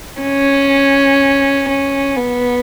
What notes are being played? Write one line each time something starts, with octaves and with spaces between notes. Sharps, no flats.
C#4
C#4
B3